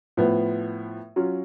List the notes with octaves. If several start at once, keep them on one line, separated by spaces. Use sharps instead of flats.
A2 F3 B3
F#3 C#4 F4